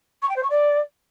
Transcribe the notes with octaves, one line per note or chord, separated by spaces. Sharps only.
C#6
G5
C5
C#6
D5